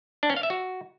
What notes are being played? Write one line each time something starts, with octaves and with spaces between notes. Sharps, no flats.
D4
C#4
F5
E5
F#4